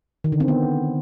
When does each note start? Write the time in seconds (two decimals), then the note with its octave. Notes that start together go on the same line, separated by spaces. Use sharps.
0.24 D#3
0.32 D3
0.40 C4
0.48 B3